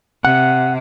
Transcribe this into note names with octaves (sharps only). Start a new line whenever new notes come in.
C3 F#5